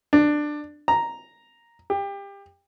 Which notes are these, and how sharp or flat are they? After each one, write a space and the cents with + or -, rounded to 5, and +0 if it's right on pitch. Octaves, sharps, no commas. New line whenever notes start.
D4 +15
A#5 +0
G4 +25